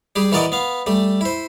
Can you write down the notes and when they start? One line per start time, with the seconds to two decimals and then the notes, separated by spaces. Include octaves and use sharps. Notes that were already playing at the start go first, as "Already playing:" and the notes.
0.16 G3 G4 G#4
0.32 E3 F#4 A#4 D5 D#5
0.52 B3 F5
0.87 G3 A3
1.21 E4 C5